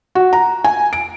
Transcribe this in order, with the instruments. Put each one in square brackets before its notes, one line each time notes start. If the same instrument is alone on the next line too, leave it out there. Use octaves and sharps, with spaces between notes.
[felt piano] F#4
A#5
G#5
D7